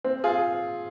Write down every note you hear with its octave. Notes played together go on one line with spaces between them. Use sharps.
C4
F4 G#4